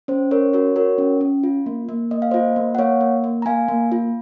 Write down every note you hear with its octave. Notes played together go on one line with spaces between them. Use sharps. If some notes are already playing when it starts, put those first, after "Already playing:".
C#4 C5
C#4 A#4 C#5
F#4 A#4 C#5
F#4 A#4 C#5
C#4
C#4
F4
A#3
A#3
A#3 D#5
F5
F4 C5 D#5
A#3
F#5
A#3 C#5 F5
A#3
A#3
A#5
A#3 F5 G#5
A#3
F4